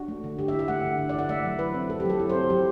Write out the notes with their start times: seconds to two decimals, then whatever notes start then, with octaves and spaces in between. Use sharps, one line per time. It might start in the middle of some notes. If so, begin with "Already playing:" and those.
Already playing: D4 F#4
0.08 A3
0.24 D3
0.38 D3 G4
0.48 E5
0.53 E4
0.59 E5
0.68 A3 F#5
0.83 D3
0.99 D3
1.09 D5
1.14 E4
1.19 F#5
1.29 A3 E5
1.45 F#3
1.59 E4 B4
1.74 C4
1.90 A3 A4
2.00 G4
2.05 F#3 A4
2.19 E4
2.29 C5
2.35 C4
2.50 F#3 G4